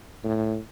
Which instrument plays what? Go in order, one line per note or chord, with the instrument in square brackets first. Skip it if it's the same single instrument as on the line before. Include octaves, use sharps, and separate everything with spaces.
[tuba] A2